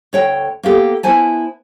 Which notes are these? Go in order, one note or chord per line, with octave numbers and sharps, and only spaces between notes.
D2 C#5 G5
A#3 B3 G4 A4
B3 E4 C5 G#5 A5